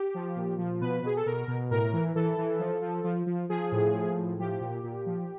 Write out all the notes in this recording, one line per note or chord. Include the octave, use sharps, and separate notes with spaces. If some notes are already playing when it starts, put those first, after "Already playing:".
Already playing: G4
F3
A#2
F3
B2 B4
B2 G#4
A4
B2 A#4
B2
A2 A#4
E3
E3 A4
E3
F3
F3
F3
F3
F3 G#4
A2
F3
A2
F3 G4
A#2
A#2
F3